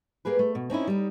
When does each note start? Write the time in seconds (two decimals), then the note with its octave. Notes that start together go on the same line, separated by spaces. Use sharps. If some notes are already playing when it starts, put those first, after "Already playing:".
0.25 A#3 G4 G#4 B4
0.39 A3
0.55 B2
0.70 C4 C#4 D#4 E4
0.87 G3 D#4